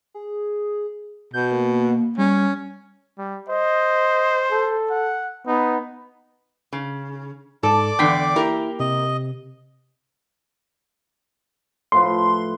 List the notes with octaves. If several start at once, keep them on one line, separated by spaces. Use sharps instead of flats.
G#4
B2 G6
A#3
G3 C#4
G3
C5 D#5
A4
F#5
B3 D#4
C#3
G#2 A4 D5 A5 D6
E2 D3 G5 B6 C7
A#3 E4 G4 A#4
C3 D#5
A2 F3 B4 C6